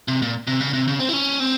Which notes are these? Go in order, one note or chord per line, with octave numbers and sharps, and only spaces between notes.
C3
A#2
C3
C#3
C3
C#3
C4
E4
C#4
C4